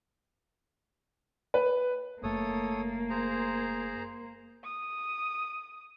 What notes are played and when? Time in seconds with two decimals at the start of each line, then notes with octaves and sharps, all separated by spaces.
1.54 B4
2.23 F#1 A3 A#3 A4 C#5 D#6
3.10 G#4 C5 A#5
4.64 D#6